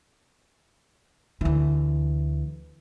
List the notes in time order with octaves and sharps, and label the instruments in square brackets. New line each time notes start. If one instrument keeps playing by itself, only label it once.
[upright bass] D2 E3